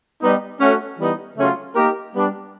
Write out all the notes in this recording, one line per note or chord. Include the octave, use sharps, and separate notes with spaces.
G3 B3 D#4
A3 C#4 F#4
E3 G3 B3 D#4
C#3 F#3 A3 C#4 F4
A#3 D#4 G4 A#4
G3 B3 D4